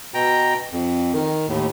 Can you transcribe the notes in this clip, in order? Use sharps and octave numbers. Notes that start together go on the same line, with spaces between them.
B2 G5 A#5
F2
D#3
D#2 A2